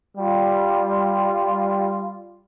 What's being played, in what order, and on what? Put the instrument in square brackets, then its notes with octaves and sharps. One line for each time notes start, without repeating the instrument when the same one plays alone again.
[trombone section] G3 F4